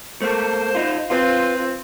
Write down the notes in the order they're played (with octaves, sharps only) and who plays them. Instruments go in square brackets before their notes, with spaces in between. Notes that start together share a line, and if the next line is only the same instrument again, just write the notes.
[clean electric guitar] A3 A#3 [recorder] C5
[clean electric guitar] D#4 F4
[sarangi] C4 [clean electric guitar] F4 [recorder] B4